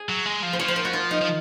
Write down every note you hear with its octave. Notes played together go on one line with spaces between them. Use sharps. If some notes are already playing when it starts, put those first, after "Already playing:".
Already playing: G#4
F#3
G#3
F3
C5
F3 C#5
C5
A#4
F#4
F4
D#4
F3